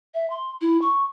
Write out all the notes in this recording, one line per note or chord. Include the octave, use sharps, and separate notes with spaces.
E5
C6
E4
C#6